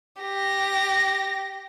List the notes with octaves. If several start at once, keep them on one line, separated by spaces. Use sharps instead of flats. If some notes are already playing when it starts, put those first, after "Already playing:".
G4 A#6